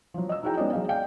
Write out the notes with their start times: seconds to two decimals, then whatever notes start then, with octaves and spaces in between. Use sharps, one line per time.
0.14 F3 F#3
0.29 D#5 E6
0.43 D#4 E4 F#4 G#4 G5 A#5
0.57 G#3 B3 C#4 D#4 D5 D#5
0.73 F#3 G#4 D#5 F5
0.89 D5 F5 G5